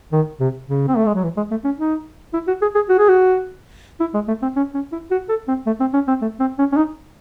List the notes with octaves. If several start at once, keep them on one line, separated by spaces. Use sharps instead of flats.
D#3
C3
C#3
C4
A3
G#3
F#3
E3
G#3
A3
C#4
D#4
E4
F#4
G#4
G#4
F#4
G#4
F#4
E4
G#3
A3
C4
C#4
C#4
E4
F#4
A4
C4
A3
C4
C#4
C4
A3
C4
C#4
C#4
D#4